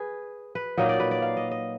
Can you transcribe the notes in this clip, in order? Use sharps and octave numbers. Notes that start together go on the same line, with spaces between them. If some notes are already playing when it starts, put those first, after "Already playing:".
Already playing: G#4 B4
B4
A#2 F#3 A#3 D#4 D#5
D5
B4
D5
F5
D#5
D#5